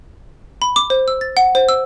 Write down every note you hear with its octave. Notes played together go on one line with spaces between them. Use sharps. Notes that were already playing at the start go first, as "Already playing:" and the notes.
B5
D6
C5
E6
A6
F#5
C5
E6